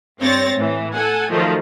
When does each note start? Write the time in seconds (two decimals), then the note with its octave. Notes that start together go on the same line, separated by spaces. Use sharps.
0.19 G2 C4 C#5 A6 A#6
0.55 A2 E3
0.92 A4 F#5 G#5
1.30 D#3 F3 F#3 A3 D#4